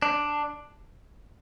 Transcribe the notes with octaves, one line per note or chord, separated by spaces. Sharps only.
D4